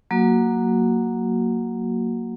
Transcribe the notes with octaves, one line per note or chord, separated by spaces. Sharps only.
F#3 A#3 F#4